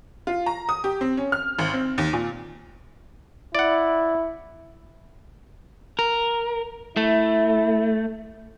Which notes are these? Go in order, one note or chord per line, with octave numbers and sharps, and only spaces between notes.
F4
A#5
D#6
G4
C4
C#4
F6
G#1
C4
D#2
A#2
E4 D5 F#5
A#4
A3 E4